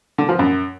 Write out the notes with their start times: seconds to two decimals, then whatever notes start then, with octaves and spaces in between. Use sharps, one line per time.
0.18 D3
0.29 F3
0.39 F#2